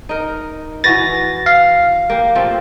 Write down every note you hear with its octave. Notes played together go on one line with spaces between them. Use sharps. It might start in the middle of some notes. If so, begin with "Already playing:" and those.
D#4 A#4
E3 F#4 B4 A6 A#6
F5
A#3 G4
F3 A3 C4